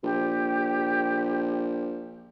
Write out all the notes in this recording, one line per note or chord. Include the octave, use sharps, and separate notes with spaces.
A#1 G4